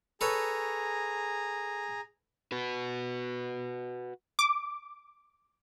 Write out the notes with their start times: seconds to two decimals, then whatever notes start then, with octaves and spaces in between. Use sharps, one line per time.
0.21 G#4 A4 B4 C#5 A#5
2.52 F#4 B4
4.39 D6